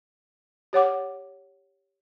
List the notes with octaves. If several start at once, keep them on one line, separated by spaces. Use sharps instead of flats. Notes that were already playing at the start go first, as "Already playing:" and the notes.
G4 C#5 F#5 D6